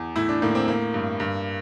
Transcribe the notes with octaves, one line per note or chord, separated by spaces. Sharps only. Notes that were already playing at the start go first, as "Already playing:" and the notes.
Already playing: E2
A2 E4
D4
A2 A#3
C4
A#3
G2
G2